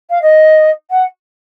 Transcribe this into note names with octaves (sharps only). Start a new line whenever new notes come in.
F5
D#5
F#5